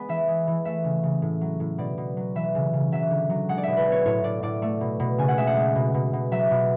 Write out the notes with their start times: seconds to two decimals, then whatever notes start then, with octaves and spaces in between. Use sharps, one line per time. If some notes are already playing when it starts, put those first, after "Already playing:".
Already playing: G#3 B3
0.09 E3 E5
0.28 G#3
0.47 E3
0.65 A3 E5
0.84 C#3
1.03 C#3
1.22 A2
1.41 F#3
1.60 A2
1.78 B2 D5
1.98 B2
2.17 F#3
2.35 E3 E5
2.55 C#3
2.73 C#3
2.92 F#3 E5
3.11 D3
3.30 F#3
3.49 G#3 F#5
3.58 D5
3.63 B2 E5
3.77 B4
3.87 B3
3.92 C#5
4.05 A2 C#5
4.24 A2 D5
4.43 A2 D5
4.62 A3
4.81 B2
5.00 B2
5.18 C#3 G#5
5.28 F#5
5.37 G#3 E5
5.47 F#5
5.57 G#3
5.75 B2
5.94 B2
6.13 B2
6.31 F#3 E5
6.51 B2